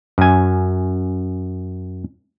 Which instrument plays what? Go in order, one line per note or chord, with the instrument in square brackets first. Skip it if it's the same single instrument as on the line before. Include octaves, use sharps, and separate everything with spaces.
[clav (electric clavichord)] F#2 G#5